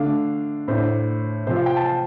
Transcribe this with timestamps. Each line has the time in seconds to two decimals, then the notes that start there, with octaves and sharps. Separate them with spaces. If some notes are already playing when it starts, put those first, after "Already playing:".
Already playing: D3 A3 D4 F5
0.68 A2 A3 D4 C5
1.47 C3 F3 C4 C5
1.56 F5
1.66 G5
1.77 A5
1.86 G5